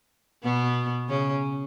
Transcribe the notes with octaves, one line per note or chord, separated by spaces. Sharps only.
B2 B3
C#3 C#4